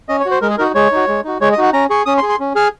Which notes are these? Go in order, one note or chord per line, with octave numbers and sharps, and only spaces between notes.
C#4 D#5
C#5
F#4
C5
G#3 A#4
G#4
D#4 F#4 A#4
G#3 C#5
D#4 F#4
G#3
D#4 F#4
G#3 C#5
D#5
D#4 F#4 F#5
C#4 A#5
G#4 C#6
C#4 D#6
C6
G#4
C6
C#4
G#4 F6